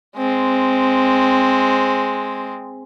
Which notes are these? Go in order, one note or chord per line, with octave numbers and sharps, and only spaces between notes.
G#3 C4